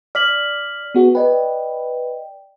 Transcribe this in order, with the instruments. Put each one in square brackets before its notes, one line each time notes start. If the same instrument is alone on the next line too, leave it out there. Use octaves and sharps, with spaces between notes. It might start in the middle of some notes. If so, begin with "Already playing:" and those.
[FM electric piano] D5 [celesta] F6 B6 F#7
[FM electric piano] B3 F#4 G#4
[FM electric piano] B4 [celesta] D5 D#5 G5